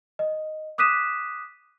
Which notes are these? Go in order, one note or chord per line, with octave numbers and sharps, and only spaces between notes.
D#5
D6 D#6 F#6 B6 D#7 E7